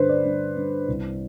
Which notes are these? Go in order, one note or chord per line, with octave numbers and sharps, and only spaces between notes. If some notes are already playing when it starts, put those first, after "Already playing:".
Already playing: G2 D3 B4 C5
D5
G2
G2
C2